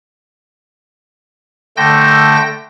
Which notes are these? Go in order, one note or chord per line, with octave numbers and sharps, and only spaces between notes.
D3 A3 G5 E6 G6 A#6